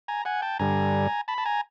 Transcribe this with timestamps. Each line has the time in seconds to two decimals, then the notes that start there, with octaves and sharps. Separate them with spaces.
0.08 G#5 A#5
0.25 F#5 G#5
0.42 G5 A5
0.59 G2 D3 G3 G#5 A#5
1.28 A5 B5
1.38 A5
1.46 G#5 A#5